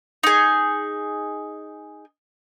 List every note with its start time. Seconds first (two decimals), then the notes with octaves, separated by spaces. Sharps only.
0.23 D#4 G#4